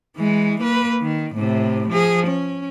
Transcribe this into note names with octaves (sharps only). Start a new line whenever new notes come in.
E3 G#3
A#3 B4
D#3
A2 C3
F3 G#4
C#4